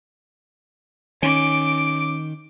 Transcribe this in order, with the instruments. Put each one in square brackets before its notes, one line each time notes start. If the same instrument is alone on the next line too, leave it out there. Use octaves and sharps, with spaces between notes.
[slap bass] D#3 [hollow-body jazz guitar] C#4 [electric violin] D6 D7